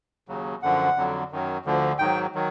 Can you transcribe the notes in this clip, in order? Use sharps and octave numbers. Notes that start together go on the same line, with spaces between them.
D#2 C#3 F#3
F#2 D3 F3 F#5
F2 D3 F#3
F#2 D#3 F#3
D2 D3 F3
G#2 D#3 F#3 G5
D#3 F#3